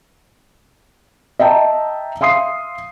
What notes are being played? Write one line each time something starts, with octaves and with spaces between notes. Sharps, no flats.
D#5 E5 G5 A5 A#5
E5 F5 C6 D#6 C7